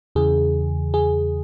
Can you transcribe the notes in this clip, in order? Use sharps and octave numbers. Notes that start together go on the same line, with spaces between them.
E2 C#3 E3 G#4
G#4